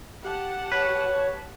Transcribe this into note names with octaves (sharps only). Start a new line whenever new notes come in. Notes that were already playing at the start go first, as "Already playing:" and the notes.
G4 F#5 A5
B4 C#5